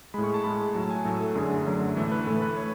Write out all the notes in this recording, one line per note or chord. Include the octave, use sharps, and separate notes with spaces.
A2 G#3 B5
C#6
A5
A2 G#3 B5
A2 F#3 A3 A5
G#5
A2 F#3 A3 A4
A4
F#2 D3 F#3 A3 G#4
F#2 D3 F#3 A3
A2 E3 A3 A4
B4
A2 E3 A3 A4
B4
C#5